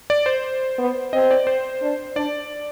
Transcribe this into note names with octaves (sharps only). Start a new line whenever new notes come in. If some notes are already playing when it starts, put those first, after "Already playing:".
D5
C5
B3
C4 D#5
D5
C5
D4
D4 D5